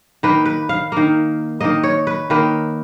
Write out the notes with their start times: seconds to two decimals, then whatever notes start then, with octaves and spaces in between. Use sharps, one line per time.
0.23 D#3 A#3 B4
0.46 B4
0.69 F5
0.92 D#3 A#3
1.61 D#3 A#3 D#5
1.84 C#5
2.07 B4
2.30 D#3 A#3 B4